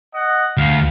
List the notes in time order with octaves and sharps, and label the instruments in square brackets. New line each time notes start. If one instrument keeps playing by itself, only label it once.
[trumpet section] D#5 F#5
[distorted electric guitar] D2 [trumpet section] F5